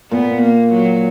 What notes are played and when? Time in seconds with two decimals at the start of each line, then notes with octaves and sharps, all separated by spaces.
0.11 A#2 B3
0.43 A#3
0.73 F#3